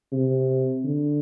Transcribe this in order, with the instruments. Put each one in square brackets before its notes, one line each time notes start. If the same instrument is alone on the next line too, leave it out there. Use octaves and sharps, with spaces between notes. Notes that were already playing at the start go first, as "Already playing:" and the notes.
[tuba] C3
D3